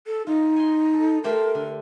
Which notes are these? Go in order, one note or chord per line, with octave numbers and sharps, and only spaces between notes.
A4
D#4 F4
G#5 C6
A4
A3 G4 A#4 C5
D3